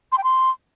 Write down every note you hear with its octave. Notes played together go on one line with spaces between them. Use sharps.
C6
G5
C6